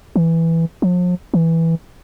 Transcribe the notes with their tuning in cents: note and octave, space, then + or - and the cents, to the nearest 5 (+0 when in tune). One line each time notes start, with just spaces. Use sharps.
E3 +0
F3 +40
E3 -5